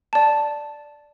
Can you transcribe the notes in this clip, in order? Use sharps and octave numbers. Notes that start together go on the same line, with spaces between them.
D5 A5